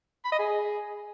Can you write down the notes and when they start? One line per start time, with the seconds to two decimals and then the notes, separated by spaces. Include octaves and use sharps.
0.24 B5
0.32 D#5
0.39 G#4